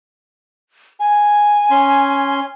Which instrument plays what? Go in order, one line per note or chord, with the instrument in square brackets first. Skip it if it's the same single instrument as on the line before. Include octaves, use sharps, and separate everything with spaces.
[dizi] G#5
[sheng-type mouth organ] C#4 C6